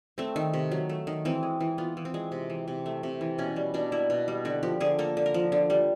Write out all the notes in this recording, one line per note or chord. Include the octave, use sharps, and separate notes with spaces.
A3 C4
D#3
C3
F#3
A3
D#3
E3 C4
G#3
E3
B3 F4
E3
C4
G#3
C3
E3
C3
A3
C3
E3
B2 C#4
G3
B2 D4
A#3 E4
B2
G3
D3 F#4
F3 G4
D3 G#4
A#3 A4
D3
A#4
F3
D3
G3